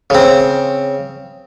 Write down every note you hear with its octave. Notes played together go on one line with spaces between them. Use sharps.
C#3 C4